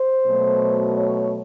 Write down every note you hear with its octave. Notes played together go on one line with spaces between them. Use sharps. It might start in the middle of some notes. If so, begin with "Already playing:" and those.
Already playing: C5
B2 F#3 A3
C#5